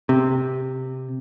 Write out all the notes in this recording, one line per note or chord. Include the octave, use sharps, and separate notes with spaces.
C3